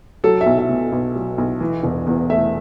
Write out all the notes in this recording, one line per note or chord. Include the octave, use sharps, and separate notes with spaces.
F#3 A4
E5
B1
E5
B2
B1
F#3
B1
E3
E1
E2
A3 E5